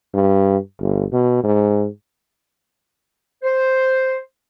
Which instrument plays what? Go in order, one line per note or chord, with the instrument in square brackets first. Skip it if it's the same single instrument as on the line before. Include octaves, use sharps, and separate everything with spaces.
[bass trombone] G2
G1
B2
G#2
[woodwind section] C5